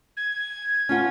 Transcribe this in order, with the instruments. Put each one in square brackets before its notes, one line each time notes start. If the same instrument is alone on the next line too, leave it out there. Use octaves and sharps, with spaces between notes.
[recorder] G#6
[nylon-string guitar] C#4 F4 F#5